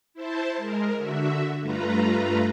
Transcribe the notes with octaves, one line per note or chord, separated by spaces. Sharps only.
E4 C5 A5
G#3 A#4
D3 F#4 E5
G2 A3 F4 B4 A#5